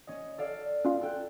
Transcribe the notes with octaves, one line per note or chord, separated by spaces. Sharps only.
C#4 D#5
A4 D5 F5
C#4 F4 F5
A4 G5 F#6